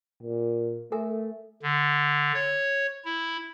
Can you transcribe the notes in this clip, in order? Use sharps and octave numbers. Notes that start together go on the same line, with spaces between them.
A#2
A3 A4 A#4 G#5
D3
C#5
E4